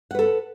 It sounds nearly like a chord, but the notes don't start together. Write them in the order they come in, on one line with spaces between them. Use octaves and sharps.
F#5 B4 A4